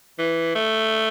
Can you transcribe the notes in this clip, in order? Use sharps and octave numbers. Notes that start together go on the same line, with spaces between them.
E3
A3